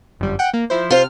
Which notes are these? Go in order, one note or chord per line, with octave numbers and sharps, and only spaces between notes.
G1 F#2 G3
F#5 G5
A#3
F3 E4 C5
C3 F4 C5 F6